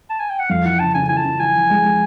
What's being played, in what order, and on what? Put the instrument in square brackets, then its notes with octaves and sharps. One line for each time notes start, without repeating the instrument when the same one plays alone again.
[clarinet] A5
G#5
G5
F#5
[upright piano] F2 [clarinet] F5
[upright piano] E3 [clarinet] F#5
[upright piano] C#3 [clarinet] A5
[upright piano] C#3 [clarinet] G#5
[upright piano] E3 [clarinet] G#5
[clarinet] A5
[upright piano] C#3
[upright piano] E3 [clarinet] G#5
[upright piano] E3
G#3
G#3